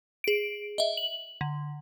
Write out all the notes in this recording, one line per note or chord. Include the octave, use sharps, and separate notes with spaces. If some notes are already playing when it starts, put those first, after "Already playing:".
G#4 D7
D#5 E5
F#7
D3